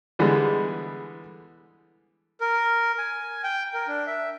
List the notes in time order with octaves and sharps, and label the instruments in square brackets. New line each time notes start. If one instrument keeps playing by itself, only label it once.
[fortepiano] D3 E3 G3 G#3 B3
[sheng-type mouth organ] A#4
G#5
G5
A#4
D4
E5